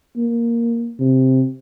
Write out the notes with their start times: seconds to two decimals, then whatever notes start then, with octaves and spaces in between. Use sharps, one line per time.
0.16 A#3
1.00 C3